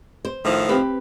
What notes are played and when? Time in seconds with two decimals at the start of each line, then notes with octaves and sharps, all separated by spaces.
0.25 C5
0.45 A2 D#3 F3
0.69 C4 G4 B4